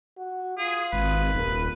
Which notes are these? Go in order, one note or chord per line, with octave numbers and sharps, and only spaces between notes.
F#4
F4 G#4
G#1 B4
D#1 A#4